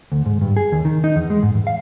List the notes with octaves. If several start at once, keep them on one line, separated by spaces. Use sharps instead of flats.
D2
G#2
G2
G#4
D#2
D#3
D#4
E2
G#3
G#2
E2
F5